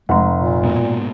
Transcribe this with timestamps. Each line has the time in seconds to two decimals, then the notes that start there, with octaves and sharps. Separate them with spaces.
0.09 F1 G#3 F#5 A#5 C6
0.34 A#2
0.63 G#2 B2 A#3